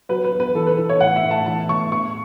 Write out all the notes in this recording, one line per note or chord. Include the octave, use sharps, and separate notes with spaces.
F#3 B4
B4
E2
B4
E3 A4
B4
E3 A4
C#5
A2 F#5
E5
A2
A5
E3 A5
A2 C#6
E2 C#6